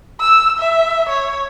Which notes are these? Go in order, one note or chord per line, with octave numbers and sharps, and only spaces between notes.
E6
E5
C#5